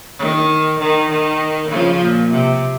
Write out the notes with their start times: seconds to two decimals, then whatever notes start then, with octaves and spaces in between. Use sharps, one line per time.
0.19 D#3
0.79 D#3
1.10 D#3
1.71 C#3 F3
2.01 A#2
2.31 C3